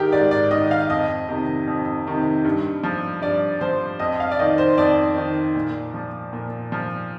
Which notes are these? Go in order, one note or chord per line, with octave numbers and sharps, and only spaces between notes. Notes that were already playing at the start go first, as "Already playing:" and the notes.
Already playing: G#2 D#3 G4 G#4 A#4
G#2 D5
D5
D#3 D#5
F5
F2 D#5
C3 D#3
F2
C3 D#3
G2
F3
G2 D5
F3 C5
F2 D#5
F5
D5
D#3 D#5
C5
F2 D5
D#3
A#2
F3
A#2
F3